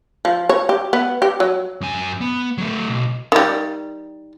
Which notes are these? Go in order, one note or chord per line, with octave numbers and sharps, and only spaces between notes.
F3
C#5
G4
B3
G4
F#3
F#2 G#5
B3
F#3 A3
B1
D#3 G3